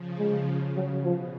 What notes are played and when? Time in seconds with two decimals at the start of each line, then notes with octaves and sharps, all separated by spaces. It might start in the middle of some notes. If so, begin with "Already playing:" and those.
Already playing: C#3 F3
0.19 G#3
0.47 C#3
0.76 C#3 F#3
1.04 B2 F3